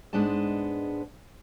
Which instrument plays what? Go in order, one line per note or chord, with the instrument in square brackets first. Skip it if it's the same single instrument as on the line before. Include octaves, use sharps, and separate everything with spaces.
[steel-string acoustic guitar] G#2 G#3 B3 D4 D#5 A5